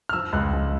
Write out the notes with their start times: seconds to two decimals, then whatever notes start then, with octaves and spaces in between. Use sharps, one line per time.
0.09 F6
0.13 F3 E6
0.33 C#2 F#6
0.53 C#2